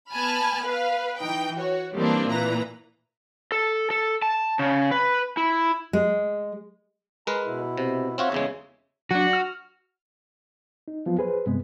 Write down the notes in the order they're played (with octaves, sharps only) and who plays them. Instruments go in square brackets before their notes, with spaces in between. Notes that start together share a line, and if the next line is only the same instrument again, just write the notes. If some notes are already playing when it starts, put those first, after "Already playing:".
[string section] B3 G#5 A5 B5 F6
B4 F5
E3 D#4 G5
F#4 C#5
E3 G3 A#3 C4 D4 D#4
A#2 E3 B4 A#5
[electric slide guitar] A4
A4
A5
C#3
B4
E4
[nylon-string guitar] G#3
[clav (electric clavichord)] G#3 A#4 B4 [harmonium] A#5
[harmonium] B2 E4
[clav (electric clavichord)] C3
[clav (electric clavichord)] C4 F4 F#4 [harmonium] C#5 E5
[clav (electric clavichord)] E2 C#3 G#3
[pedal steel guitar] F#3 D4 [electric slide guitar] F#4
[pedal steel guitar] F6
[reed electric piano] D#4
F3 F#3 B3 F4
G#4 B4 C5
G2 C3 G#3 B3